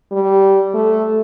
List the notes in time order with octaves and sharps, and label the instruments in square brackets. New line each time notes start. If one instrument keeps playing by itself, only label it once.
[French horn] G3
A3